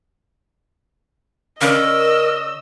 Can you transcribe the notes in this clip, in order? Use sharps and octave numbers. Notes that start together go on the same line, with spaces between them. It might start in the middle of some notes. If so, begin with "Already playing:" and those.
C#3 C#4 A#4 D5 D#5 E6